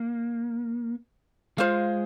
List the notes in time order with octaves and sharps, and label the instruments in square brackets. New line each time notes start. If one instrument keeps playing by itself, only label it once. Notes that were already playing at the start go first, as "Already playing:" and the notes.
Already playing: [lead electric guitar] A#3
[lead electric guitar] G#3 [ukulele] F4 C5 F5